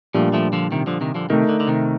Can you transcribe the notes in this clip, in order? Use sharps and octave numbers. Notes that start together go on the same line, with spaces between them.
A#2 F3 G3 A3 D4 G4
F3 A3
D3 F3
C3 D#3
D3 F3
C3 D#3
D3 F3
C3 D#3 A3 D#4 A#4
D3
D3
C3 D#3